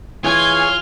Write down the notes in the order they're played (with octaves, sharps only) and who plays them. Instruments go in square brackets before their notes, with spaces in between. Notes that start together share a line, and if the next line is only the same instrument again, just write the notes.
[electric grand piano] E3 [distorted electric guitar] F4 [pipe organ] G#4 C#5 [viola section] G#5